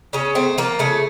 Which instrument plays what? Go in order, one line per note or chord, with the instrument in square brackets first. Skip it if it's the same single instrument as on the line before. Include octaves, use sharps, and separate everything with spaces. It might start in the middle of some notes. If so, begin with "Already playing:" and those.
[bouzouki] C#3 C#4
A3 C4
F3 A#3
C#3 A3